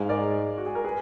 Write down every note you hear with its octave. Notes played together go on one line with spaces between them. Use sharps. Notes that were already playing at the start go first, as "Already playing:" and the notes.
Already playing: G#2 F5 G#5
A#4 D5
F#4
G#4
A#4
G#4 B4